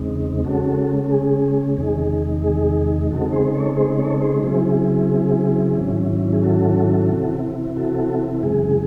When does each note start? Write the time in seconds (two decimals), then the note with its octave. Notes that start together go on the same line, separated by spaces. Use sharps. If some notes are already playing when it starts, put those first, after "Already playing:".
Already playing: E2 C#3 G#3 C4 D#4
0.44 C#3 G#3 C#4 F#4 A4
1.04 A4
1.11 G#4
1.77 E2 C3 D#3 G#3 D#4 G#4
2.44 G#4
3.10 C#3 G#3 C4 D#4 F#4 A4
3.32 G#4 C5
3.54 A4 C#5
3.77 G#4 C5
3.99 A4 C#5
4.21 G#4 C5
4.43 C#3 F#3 C4 E4 G#4
5.77 G#2 D#3 F#3 C#4 E4
6.33 G#4
6.43 F#4 A4
7.09 C3 E3 C4 E4
7.76 F#4 A4
8.42 F#2 C#3 G#3 G#4